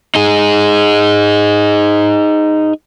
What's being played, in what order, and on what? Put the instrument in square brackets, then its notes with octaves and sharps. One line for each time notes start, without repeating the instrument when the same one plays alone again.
[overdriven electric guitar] D#4 G#4